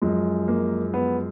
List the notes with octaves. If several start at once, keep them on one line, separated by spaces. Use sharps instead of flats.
F#2 F3 G#3
A#3
B3